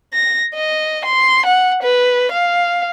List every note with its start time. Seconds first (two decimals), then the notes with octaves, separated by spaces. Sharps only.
0.13 A#6
0.54 D#5
1.05 C6
1.46 F#5
1.83 B4
2.32 F5